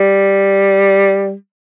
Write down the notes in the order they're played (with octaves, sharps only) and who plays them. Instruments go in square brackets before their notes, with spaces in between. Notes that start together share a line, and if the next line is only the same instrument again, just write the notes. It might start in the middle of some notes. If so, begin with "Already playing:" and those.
Already playing: [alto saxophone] G3